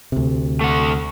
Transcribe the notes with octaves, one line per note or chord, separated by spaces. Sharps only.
D2 C3
A3 F#5